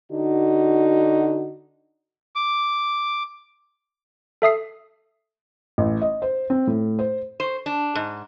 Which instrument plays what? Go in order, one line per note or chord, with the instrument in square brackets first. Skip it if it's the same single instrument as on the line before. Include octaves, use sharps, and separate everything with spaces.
[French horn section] D3 D#4 F#4
[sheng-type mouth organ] D6
[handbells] A4 E5 D#6 C7
[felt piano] A1
D#5
C5
C4
A2
C5
[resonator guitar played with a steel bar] C5
D4
G#2